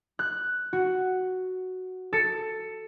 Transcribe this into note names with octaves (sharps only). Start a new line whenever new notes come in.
F#6
F#4
A4 C#7